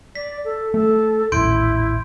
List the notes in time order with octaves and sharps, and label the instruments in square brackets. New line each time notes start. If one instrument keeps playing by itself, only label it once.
[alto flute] D5 [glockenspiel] B6
[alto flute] A4
[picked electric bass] A3 [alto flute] A4
[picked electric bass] D#1 A1 [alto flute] E4 [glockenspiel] C6 G6 D7